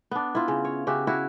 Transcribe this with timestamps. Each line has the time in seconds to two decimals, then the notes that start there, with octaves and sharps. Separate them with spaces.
0.11 B3 D4
0.35 E4 F4
0.48 C#3
0.65 C#5
0.87 C#3 F#4 G4 E5
1.07 E4 F#4 C#5